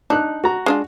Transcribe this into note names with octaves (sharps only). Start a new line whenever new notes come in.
D4 D#4 F#6
F#4 A#5
G#3 D4 F4